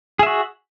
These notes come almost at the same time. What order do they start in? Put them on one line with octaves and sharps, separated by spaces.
G#4 E5 F#4